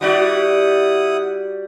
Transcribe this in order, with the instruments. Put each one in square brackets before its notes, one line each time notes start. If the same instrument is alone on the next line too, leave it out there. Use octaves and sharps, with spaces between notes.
[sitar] G3 F#4 D5 [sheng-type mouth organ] E4 F#5 D#6